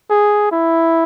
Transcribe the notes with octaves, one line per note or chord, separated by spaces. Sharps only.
G#4
E4